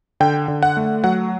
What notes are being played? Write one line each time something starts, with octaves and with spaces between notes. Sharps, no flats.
D3 G5
D3
F#5
A3
F#3 F#5